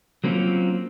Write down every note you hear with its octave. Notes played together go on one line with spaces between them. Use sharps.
F#3 A#3 C4 C#4 F4